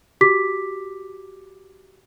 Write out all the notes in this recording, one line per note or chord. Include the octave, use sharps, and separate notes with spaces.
F#4 G4 D6 B6